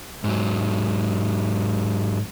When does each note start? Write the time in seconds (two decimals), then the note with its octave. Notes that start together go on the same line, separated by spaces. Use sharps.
0.24 G#2 F#3